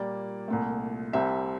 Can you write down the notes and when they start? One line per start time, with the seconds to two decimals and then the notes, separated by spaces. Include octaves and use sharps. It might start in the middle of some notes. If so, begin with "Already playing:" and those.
Already playing: A#2 G3 A#3 D5
0.48 C2 A#2 A3
1.13 C2 C3 G3 C4 E5